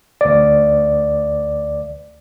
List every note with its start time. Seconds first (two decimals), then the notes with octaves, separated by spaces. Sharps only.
0.21 D2 D5